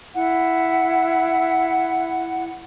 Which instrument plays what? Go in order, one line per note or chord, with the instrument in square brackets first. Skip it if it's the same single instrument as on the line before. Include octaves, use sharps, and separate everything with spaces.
[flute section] E4 F#5